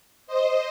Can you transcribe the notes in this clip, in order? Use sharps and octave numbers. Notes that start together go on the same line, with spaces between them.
C5 D#5